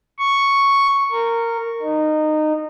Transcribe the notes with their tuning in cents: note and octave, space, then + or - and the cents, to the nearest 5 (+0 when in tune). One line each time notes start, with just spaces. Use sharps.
C#6 +0
A#4 -15
D#4 -20